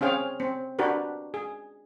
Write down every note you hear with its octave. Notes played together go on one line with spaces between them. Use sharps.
C4 C#4 G#4 F5 G5
C4
D4 F#4 G4 A#4 B4
G#4